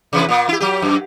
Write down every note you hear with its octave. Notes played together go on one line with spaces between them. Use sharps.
C3 E3 B4
A#2 A#3
E4 G4
F#3 G4
F#2